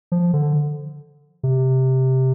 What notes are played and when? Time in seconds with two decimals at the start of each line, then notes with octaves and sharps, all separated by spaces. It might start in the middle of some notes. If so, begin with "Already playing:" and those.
0.12 F3
0.33 D3
1.43 C3